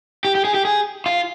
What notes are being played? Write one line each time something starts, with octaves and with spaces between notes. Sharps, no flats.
G4
G4
G#4
G4
G#4
F4